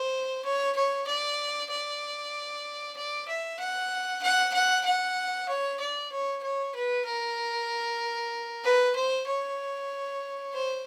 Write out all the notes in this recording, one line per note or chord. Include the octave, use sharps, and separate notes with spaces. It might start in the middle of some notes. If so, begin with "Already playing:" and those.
Already playing: C5
C#5
C#5
D5
D5
D5
E5
F#5
F#5
F#5
F#5
C#5
D5
C#5
C#5
B4
A#4
B4
C5
C#5
C5